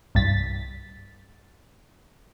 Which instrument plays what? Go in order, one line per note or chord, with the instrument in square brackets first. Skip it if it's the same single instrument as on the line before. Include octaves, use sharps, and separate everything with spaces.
[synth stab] C2 G2 A6 B6